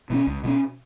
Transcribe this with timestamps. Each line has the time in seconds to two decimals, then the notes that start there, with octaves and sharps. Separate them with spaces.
0.10 B2 G3 C#4
0.27 C#2
0.43 B2 G3 C#4